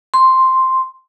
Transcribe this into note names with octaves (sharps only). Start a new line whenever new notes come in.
C6